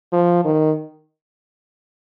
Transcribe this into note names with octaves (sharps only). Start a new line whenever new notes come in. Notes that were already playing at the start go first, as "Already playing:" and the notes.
F3
D#3